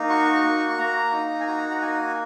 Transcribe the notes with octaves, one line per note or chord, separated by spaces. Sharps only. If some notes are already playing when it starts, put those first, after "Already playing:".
Already playing: A#3 D#4
F#4 C#6
A#3
C#6
A#3 A#5
D#4
G#5
F#4 A#5
F#5
A#3 G#5